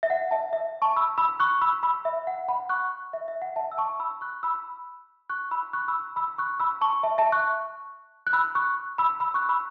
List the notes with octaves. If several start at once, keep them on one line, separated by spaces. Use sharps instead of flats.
E5
F#5
E5 A5
E5
A5 C#6
B5 E6
B5 E6
C#6 F#6
B5 E6
B5 E6
E5
F#5
F#5 B5
C#6 F#6
E5
E5
F#5
E5 A5
E6
A5 C#6
B5 E6
C#6 F#6
B5 E6
C#6 F#6
B5 E6
C#6 F#6
B5 E6
B5 E6
C#6 F#6
B5 E6
A5 C#6
E5 A5
E5 A5
C#6 F#6
F#6
B5 E6
C#6 F#6
B5 E6
B5 E6
C#6 F#6
B5 E6